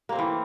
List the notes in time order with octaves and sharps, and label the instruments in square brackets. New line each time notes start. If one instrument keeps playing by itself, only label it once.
[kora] A#3
C4
A3
E3